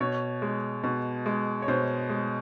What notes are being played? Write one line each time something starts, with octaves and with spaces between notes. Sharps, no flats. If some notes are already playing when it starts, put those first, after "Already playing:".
B2 C#5
G#3
B2
G#3
C#5
B2 C5
G#3